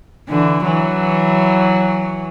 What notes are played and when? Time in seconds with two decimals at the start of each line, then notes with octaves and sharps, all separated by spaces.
0.29 D3 E3
0.66 E3 F#3